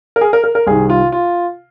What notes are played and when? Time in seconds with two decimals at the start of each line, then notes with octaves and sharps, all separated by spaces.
0.16 A#4
0.21 G#4
0.33 A#4
0.44 A#4
0.55 A#4
0.67 C2 C3 D#3 G#4
0.90 F4
1.12 F4